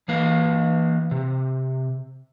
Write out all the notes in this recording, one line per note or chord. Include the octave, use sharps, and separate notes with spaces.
E3 A#3 B4 F5
C3